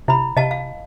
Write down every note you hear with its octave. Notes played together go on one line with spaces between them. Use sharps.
C3 E4 B5
C3 D#5 F5 A5
F5